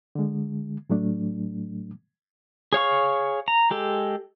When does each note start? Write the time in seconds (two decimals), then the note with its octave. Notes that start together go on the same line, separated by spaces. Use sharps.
0.15 D3 G#3
0.90 A2 F#3 A3 D4
2.73 G#4 C#5 F5 C#6
3.48 A#5
3.70 G#3 G4 A4